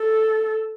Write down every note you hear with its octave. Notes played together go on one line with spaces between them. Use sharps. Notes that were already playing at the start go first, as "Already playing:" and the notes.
Already playing: A4